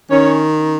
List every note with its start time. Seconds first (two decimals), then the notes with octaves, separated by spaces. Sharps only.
0.10 D#3 C#4 C#5